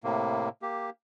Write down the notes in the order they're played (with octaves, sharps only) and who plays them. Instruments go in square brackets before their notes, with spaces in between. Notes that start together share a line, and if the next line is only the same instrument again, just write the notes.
[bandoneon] A2 C3 A#3
A#3 G4